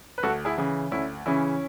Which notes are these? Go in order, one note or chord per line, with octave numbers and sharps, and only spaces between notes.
B4
D2 F#4 A4
E4 G#4
C#3 E3
D2 C#4 E4
C#3 E3 C#4 E4